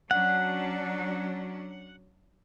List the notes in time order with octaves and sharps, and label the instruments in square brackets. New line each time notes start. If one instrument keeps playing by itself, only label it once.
[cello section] F#3 C#4 D4 [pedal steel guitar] F#5